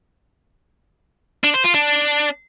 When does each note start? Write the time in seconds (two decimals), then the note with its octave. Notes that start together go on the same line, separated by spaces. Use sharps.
1.44 D4
1.54 C5
1.64 F4
1.74 D4